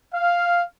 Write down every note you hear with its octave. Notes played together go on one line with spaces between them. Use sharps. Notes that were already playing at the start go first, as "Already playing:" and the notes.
F5